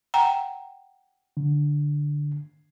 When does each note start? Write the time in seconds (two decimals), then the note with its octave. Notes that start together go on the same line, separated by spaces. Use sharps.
0.14 F#5 G5 A#5
1.37 D3